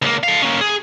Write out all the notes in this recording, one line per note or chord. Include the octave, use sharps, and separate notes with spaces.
C#2 A#3
A4 F5
A#3 C#4
G#4